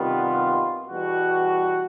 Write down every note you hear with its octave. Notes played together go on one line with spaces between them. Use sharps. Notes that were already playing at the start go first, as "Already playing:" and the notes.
Already playing: C3 D#3 G3 B3 F4
E2 B2 G3 F#4